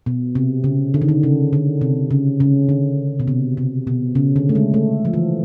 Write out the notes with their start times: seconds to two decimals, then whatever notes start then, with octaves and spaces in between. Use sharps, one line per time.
0.06 B2
0.35 C3
0.64 C#3
0.94 D3
1.01 D#3
1.08 D3
1.23 C#3
1.53 D3
1.81 C3
2.11 C#3
2.40 C#3
2.69 D3
3.20 B2
3.28 C3
3.57 C3
3.87 B2
4.15 C#3
4.36 D3
4.49 A3
4.55 G#3
4.74 A3
5.05 F3
5.13 E3